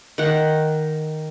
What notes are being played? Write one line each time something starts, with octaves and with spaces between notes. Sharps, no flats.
D#3 F#5